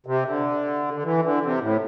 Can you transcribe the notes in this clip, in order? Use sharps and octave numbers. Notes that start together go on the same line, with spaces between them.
C3
D3
D3
E3
D3
C3
A2